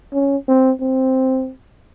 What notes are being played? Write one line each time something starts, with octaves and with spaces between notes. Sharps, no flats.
C#4
C4
C4